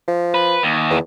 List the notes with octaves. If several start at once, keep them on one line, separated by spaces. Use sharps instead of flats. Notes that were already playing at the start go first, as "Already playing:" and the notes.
F3
B4
D#2
E2